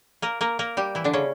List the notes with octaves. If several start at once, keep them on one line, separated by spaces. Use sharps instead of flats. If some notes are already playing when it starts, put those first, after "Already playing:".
A#3 A#4
A#3 A#4
A#3 A#4
G3 G4
E3 E4
D3 D4
C#3 C#4